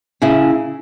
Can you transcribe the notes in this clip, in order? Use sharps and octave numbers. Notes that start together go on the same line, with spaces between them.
C#3 E4